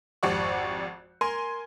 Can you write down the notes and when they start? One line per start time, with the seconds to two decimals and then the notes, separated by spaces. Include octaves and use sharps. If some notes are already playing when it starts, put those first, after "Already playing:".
0.23 G#1 F2 G4 D5 F#5 C#6
1.21 A#4 G#5 C6